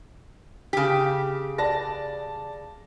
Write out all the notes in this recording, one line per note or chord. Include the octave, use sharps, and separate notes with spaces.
C#3 G4
D5 A5 A#6